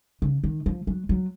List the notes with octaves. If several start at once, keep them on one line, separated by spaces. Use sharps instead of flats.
C#3
D#3
F3
F#3
F#3